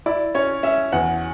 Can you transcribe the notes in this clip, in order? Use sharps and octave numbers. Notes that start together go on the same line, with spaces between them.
E4 D5
C#4 C#5
C#4 E5
E2 F#5